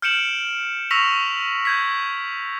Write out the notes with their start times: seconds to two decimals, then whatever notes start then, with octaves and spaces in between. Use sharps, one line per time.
0.02 F6 G6 C#7 D7 E7 F#7
0.91 C#6 E6 F6 A#6 B6 F7
1.65 G6 G#6 B6